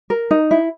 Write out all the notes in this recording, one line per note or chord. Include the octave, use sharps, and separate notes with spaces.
A#4
D#4
E4